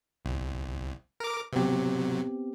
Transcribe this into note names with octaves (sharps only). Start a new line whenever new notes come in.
C2
A#4 D6
C3 F#3 B3 C4 G4